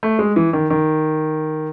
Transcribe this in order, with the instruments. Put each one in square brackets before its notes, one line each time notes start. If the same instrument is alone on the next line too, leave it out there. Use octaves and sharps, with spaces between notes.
[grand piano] A3
G#3
E3
D#3
D#3